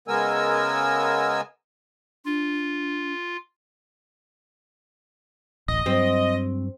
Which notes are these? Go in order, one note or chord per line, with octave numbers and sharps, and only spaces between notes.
C#3 G#3 B3 A#4 G#5 E6
D4 F4
D1 A1 D#5
G2 F#3 C4